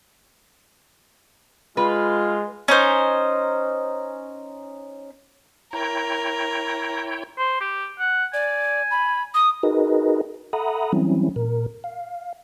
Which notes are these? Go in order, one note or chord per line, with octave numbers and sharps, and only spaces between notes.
G#3 F4 B4
C#4 D#4 C5
E4 A#4 C#5 G5
C5
G4
F#5
D5 G#5
B5
D#6
D#4 F#4 G#4 A#4 B4 D#5
A4 E5 F#5 A#5 B5 D#6
E3 F#3 G3 C4 C#4 E4
A#2 A#4
F5